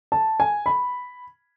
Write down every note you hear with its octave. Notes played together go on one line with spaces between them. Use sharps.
A5
G#5
B5